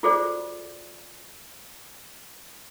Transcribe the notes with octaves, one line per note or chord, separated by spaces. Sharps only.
F4 F#4 G#4 A4 C5 D5